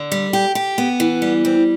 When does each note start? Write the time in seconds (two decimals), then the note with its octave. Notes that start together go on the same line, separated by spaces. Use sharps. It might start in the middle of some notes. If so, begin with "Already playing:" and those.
Already playing: D3
0.12 G3
0.33 G4
0.55 G4
0.78 B3
1.00 E3
1.22 G3
1.45 C4